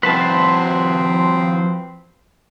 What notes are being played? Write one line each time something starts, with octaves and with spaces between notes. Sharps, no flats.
F3 C4 F4 F#4 B4 C5 A5